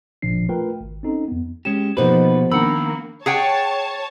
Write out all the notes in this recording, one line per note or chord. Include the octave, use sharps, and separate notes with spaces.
G1 A#2 F3 D4 C7
A3 F4 A#4 B4 G5
G#1
C4 C#4 D#4 A4
F2 B3
G#3 C#4 G4 E7
B2 F3 A#3 D#4 G4 B4 C5
D#3 A#3 D4 F#5 B5 E6
G#4 C#5 F#5 G5 A5